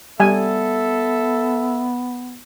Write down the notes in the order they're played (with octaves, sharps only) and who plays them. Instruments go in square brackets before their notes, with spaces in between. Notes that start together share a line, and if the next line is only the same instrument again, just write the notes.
[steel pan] G3 G#5 [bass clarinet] B3 [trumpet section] A4 E5